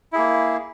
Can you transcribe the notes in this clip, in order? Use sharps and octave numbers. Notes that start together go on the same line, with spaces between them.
A#3 E4 G#4